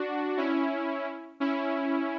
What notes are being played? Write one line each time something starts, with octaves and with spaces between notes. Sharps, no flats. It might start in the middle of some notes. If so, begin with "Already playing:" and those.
Already playing: D4 F#4
C#4 E4
C#4 E4